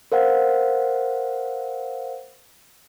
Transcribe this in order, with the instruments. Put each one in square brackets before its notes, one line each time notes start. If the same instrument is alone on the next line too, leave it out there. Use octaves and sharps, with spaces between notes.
[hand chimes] A#4 C5 F5 F#5